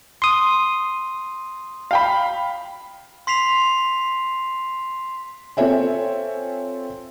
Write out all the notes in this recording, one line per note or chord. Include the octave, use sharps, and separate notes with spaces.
C6 D#6
F5 G5 B5
C6 B6 C7 F7
C4 F4 A4 C#5 E5 G#5